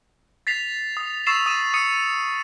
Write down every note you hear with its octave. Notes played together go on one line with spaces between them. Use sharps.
A6 B6 C7 F7
D#6
C#6 E6 A6 C7 E7 F7
D#6 D#7 E7
D#6 C#7 D#7